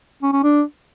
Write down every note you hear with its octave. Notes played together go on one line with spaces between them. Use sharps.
C#4
C#4
D4